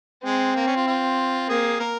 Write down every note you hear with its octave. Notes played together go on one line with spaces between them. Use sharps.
G#3 C4
A#3
C#4
F4
F4
A#3 G#4
A#4